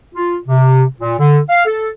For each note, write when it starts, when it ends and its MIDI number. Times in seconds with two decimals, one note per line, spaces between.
0.15 0.36 65
0.47 0.83 48
1.00 1.15 46
1.20 1.39 50
1.50 1.65 77
1.65 1.88 69